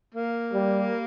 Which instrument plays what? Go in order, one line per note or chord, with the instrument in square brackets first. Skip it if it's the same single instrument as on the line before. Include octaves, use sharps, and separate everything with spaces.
[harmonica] A#3
[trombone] G3